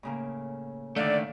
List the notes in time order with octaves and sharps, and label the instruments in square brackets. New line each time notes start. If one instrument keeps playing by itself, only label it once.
[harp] A2 C#3 A#3
[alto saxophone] D3 [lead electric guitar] D#3 A3 [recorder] D5 [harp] F5